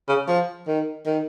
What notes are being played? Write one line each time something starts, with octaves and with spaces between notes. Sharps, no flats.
C#3
F3
D#3
D#3